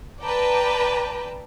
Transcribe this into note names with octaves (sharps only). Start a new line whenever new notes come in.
B4 D5 G5 A5 A#5